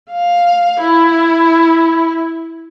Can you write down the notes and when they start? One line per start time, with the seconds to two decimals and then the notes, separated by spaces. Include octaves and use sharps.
0.11 F5
0.80 E4